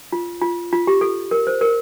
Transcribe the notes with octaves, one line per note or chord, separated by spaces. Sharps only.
F4
F4
F4
G4
A4
A#4
C5
A#4